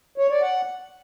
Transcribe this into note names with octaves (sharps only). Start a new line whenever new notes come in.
C#5
D5
F#5